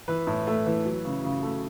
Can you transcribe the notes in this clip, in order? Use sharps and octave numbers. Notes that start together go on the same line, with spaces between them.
E3 B4
A2
A3
E3
F#3
C#3
C#3
A3